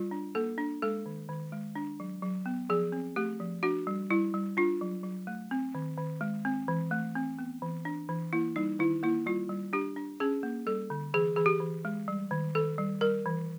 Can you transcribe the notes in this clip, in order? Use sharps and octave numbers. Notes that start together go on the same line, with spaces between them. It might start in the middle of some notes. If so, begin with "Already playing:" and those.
Already playing: G3 F4
D4
A#3 A4
D4
G#3 A4
D#3
D#3
G#3
D4
F#3
F#3
B3
F3 G#4
C4
A3 G4
F3
D4 F#4
G3
G3 E4
G3
D4 F4
F#3
F#3
A3
C4
D#3
D#3
G#3
C4
E3
A3
C4
B3
E3
D4
E3
A#3 E4
G3 D#4
D#3 E4
A#3 E4
G3 F4
G3
D4 G4
D4
C#4 G#4
A#3
G3 A4
D3
E3 G#4
E3 G#4
G4
E3
G#3
G3
D#3
D#3 A4
G3
G3 A#4
E3